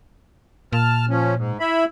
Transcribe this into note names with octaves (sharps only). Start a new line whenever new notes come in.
A#2 A5 F6
F3 C#4
G#2
E4 E5 B5